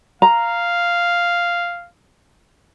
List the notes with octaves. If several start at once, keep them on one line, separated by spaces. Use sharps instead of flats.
F5 A#5